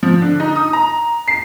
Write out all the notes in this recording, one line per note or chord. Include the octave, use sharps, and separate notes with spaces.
F3
D3
D#4
D#6
A#5
C7